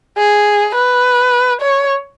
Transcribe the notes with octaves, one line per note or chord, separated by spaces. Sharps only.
G#4
B4
C#5